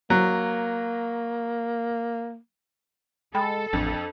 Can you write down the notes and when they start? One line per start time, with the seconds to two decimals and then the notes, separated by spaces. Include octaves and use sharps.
0.10 F#3 A#3
3.35 G#3 A4 G5 B5
3.73 A1 F2 D4